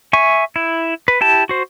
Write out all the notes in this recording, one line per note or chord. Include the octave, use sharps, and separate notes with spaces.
E5 G#5 C#6
E4
B4
E4 G4 A5
F#4 C5